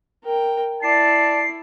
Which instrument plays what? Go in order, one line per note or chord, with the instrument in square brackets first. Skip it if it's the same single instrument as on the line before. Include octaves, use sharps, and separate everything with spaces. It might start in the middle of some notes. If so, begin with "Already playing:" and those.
[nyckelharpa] A#4 G5
[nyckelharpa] E4 [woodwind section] D5 A5 [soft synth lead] C7